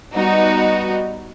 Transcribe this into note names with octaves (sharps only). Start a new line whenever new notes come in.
G3 B3 D#4 F#4